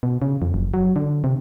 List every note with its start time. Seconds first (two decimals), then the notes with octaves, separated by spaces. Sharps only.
0.03 B2
0.22 C#3
0.42 F2
0.54 F#1
0.74 F#3
0.96 D3
1.24 C3